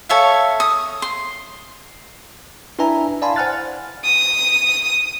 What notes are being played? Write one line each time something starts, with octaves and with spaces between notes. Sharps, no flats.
A4 C#5 E5 F5
D#6
C6
D4 E4 B4 E5 G#5 A#5
D5 F5 G#5 A5 B5 C6
C5 F#5 G#5 F6 F#6 A6
D#6